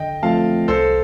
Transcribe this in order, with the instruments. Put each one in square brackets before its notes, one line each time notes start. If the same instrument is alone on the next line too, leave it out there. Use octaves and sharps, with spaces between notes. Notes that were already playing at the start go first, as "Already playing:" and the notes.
Already playing: [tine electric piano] D3 [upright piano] D#5 G5
[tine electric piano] F3 A3 C4 F4 [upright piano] F5 A5
[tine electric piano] C2 [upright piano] A4 C5